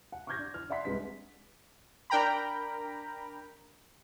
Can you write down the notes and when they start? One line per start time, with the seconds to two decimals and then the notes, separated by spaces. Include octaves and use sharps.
0.12 F#5
0.27 C#6 D6 F6 G6 G#6 A#6
0.39 D4
0.54 F6
0.70 D5 E5 F#5 C6 B6
0.85 C2 G#3 D4 B4 B6
2.10 D4 A#4 G5 A#5 B5